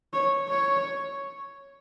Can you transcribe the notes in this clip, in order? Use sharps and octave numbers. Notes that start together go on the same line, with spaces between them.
C#5
C#5